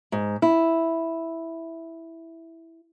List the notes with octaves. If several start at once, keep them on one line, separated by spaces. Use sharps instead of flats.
G#2
E4